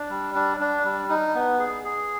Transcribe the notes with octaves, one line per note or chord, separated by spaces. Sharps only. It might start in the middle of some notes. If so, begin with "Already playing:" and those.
Already playing: D4
G3
D4
D4
G3
D#4
B3
G#4
G#4